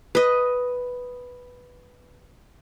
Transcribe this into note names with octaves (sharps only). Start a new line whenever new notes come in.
B4 D#5